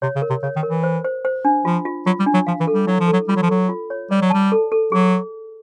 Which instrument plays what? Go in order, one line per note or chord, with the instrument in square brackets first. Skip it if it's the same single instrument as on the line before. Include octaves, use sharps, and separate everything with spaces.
[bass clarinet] C3 [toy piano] C#5
[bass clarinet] C#3
[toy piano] A#4
[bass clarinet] C3
[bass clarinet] C#3 [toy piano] C#5
[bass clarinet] D#3
[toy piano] A#4
[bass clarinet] E3
[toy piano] C5
C5
C5
D4
[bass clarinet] F3 [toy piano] F4
[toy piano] F4
[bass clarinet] F#3 [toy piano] F4
[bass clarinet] G3
[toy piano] D4
[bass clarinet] F#3
[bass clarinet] F3 [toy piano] F5
[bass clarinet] E3
[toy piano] A4
[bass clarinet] G3
[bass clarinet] F#3 [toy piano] E4
[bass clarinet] F3
[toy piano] A4
[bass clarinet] F#3
[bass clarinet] G3 [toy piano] F4
[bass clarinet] F#3
F3
[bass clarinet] F#3 [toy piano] A4
[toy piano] F4
C#5
[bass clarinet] G3 [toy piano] D5
[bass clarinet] F#3
[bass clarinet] G3 [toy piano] A5
[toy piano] A4
A4
[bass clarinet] F#3 [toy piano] G#4